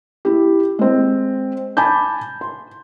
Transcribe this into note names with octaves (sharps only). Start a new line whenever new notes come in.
E4 G4
G#3 C4
G#5 A5 B5 D6 G6
C6